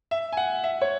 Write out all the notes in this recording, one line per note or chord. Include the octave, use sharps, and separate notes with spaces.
E5
G#5
F#5
E5
C#5